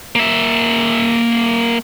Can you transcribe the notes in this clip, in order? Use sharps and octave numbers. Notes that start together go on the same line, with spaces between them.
A#3 E5